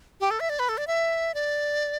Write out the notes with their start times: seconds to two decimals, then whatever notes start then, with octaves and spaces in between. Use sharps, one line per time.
0.21 G4
0.31 A4
0.40 E5
0.50 D5
0.59 B4
0.69 A4
0.78 D5
0.87 E5
1.34 D5